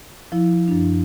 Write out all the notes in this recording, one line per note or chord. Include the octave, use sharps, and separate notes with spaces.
F3 E4
F#2 D4